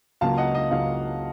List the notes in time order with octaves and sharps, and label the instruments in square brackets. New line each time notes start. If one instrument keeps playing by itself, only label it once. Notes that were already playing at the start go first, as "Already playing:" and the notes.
[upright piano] C#2 C#3 F#3 A#3 F5 A5
D#5 F#5
D#5
C#2 C#3 F#3 A#3 F5